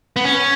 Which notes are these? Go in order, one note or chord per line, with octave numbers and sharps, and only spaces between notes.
B3
C#4